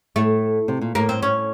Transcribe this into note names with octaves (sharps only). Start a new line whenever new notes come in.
A2 A3
C3
A#2
A2 A#3
C4
C#4